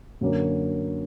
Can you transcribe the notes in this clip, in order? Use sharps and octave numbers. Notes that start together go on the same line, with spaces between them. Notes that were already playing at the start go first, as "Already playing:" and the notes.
F#2 D3 F#3 A#3 C#4